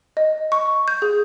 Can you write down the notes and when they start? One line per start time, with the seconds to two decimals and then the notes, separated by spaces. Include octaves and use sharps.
0.17 D#5
0.52 C#6
0.88 G6
1.02 G#4